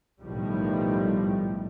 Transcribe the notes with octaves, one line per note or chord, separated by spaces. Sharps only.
B1 A2 D#3 F3 G3 A3